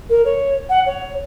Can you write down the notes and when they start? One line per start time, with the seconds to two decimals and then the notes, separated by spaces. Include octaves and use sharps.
0.09 A#4
0.25 C#5
0.69 F#5
0.86 C#5